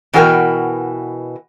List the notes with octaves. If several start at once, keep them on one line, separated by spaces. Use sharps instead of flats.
B2 E3 F#4 A4 A#4 G5